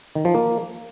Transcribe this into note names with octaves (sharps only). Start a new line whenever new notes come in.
D#3
F3
A#3